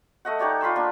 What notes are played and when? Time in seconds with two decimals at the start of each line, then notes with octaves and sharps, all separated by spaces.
0.25 A3 D#5 F#5
0.39 D#4 G4 C#5 D5
0.61 F4 B5 C6 E6
0.76 A#3 D4